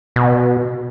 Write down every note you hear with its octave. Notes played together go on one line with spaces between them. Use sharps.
B2